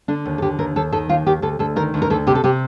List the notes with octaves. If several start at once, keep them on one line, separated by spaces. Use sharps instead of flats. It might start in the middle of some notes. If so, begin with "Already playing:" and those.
D3 D4
D#2
A4
D3 G4
D#2 A#4
D#2 A4
D#3 A4
D#2 F4
D#2 G4
D2 A4
D2 A4
D#3 A#4
D2
A#4
D2 A4
C3 G4
A4
C3 G4